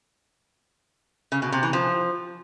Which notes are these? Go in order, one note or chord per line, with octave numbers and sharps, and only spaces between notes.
C#3
B2
C3
E3
F3